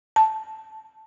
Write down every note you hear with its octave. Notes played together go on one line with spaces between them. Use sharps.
A5